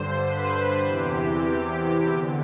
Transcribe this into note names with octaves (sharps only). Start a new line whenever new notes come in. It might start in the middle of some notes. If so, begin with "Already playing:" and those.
Already playing: G2 D3 C5
B4
E2 C3 E3 G4
E2 D3